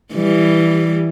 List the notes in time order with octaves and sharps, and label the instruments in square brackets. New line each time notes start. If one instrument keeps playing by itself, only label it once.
[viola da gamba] E3 G3